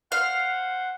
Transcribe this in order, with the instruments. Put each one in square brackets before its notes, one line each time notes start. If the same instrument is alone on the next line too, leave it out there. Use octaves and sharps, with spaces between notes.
[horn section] C5 F#5 [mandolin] F5